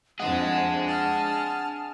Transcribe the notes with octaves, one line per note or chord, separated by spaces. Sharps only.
F2 D4 G#4 D#5 F#5 A5
A5 F6